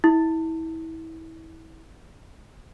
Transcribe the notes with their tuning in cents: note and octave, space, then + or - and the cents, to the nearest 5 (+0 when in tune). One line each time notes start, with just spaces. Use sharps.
E4 -30